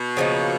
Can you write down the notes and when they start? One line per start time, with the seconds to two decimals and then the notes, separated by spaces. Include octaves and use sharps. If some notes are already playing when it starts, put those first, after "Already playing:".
Already playing: B2
0.17 C#3 F3 A#3 D#4